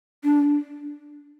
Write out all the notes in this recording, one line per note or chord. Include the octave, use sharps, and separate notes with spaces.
D4